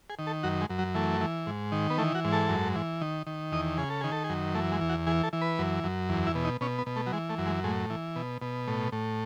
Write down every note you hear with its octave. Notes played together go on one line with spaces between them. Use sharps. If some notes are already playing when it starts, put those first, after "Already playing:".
G#4
D#3
A4
F#2 F#4
G#3
F#2
F#3
E3 A3
E3
G#2
D#3
B3
E3 A3
F#4
G#2
A4
F#2
E3
D#3
D#3
E2 D#5
C#3 G#4
A4
D#3 G#4
A4
G#4
F#2
E3 A3
G#3
E2
F#4
E3 G#4
A4
E3
B4
F#2
F#2
E2
E4
B2
D#4
B2 C#4
B3
B2
A3
F#3
E3 G#3
A3
F#2
G#3
A2 G#3
E3
B2
B2
A2
A2